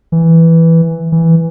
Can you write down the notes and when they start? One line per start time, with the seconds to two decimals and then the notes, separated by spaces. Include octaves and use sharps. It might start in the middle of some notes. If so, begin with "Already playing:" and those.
0.12 E3
1.12 E3